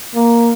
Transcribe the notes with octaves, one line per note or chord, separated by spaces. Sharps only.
A#3